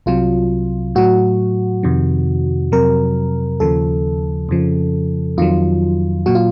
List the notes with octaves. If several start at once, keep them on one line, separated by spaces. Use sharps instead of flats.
C2 C3 F#3 F4
A2 F#3 F#4
F2 C3 D#3
F2 C3 F#3 A#4
D#2 C#3 F3 A4
F2 C#3 F3
F2 D#3 F#3 F4
A#2 F#3 F#4
F4